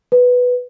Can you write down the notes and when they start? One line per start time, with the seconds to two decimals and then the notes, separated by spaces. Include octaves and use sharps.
0.12 B4